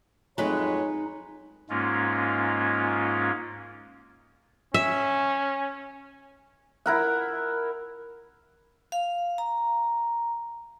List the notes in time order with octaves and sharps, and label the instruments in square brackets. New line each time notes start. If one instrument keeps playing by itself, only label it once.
[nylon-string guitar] F2 F#3 A3 [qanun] G#3 B4 [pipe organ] D#4 [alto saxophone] C#5
[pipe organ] G#2 G#3 A#3 C#4 F4
[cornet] C#4 [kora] E5
[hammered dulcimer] E4 A#4 F#5
[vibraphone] F5
A#5